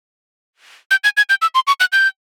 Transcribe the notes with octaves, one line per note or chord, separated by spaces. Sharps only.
G6
G#6
G#6
G6
E6
C6
C#6
F#6
G6